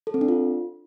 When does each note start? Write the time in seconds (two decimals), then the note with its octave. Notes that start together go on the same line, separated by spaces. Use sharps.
0.07 A4
0.14 C4
0.21 D4
0.28 F4